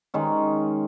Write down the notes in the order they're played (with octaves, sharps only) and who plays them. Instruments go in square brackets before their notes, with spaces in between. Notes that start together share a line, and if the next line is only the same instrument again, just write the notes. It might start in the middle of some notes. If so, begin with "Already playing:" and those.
[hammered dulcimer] D#3 G#3 C#4